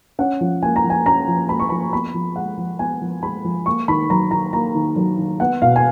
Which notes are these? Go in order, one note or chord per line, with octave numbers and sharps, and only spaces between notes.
C#4 F#5
F3
A#3 G#5
A#5
F3
G#5
C#4 A#5
F3
A#3 B5
C#6
F3 B5
B3 B5
F3
G#3 F#5
F3
B3 G#5
F3
G#3 B5
F3
A#3 C#6
D#3 B5
F#3 A#5
D#3 A#5
A#3 A#5
D#3
F#3
D#3
B3 F#5
B2 F5
G#5